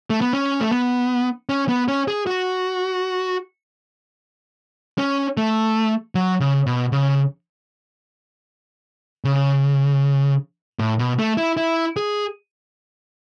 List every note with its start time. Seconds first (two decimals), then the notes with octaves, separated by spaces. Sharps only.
0.10 A3
0.21 B3
0.33 C#4
0.61 A3
0.72 B3
1.49 C#4
1.69 B3
1.88 C#4
2.08 G#4
2.27 F#4
4.98 C#4
5.37 A3
6.15 F#3
6.40 C#3
6.66 B2
6.92 C#3
9.25 C#3
10.79 A2
10.99 B2
11.19 A3
11.37 E4
11.57 E4
11.96 G#4